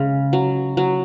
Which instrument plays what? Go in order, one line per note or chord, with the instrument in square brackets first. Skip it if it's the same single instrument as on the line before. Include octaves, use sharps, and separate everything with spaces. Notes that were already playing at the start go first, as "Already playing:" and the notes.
Already playing: [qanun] C#3 G#3
F#3
F#3